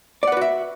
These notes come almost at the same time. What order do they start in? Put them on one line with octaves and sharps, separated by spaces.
D5 F#5 B4 F#4 E5